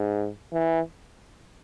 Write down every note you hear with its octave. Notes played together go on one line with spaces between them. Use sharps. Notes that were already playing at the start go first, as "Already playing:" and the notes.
Already playing: G#2
E3